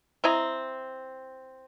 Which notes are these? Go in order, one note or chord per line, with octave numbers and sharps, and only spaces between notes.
C4 E4 D#5 A#5